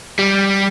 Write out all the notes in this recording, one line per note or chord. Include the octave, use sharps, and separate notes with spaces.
G3